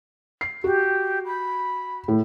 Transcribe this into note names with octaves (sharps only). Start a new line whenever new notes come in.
C7
F#4 G4
B5
A2